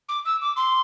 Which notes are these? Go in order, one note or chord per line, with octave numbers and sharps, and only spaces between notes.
D6
E6
D6
C6